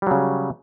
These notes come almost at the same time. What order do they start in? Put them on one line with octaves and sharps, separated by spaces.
G3 F#3 C#3